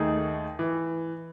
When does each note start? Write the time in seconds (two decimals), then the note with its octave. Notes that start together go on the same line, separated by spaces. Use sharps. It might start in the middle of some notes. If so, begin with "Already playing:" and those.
Already playing: D#2 D#3 A3 D#4 G#4
0.59 E3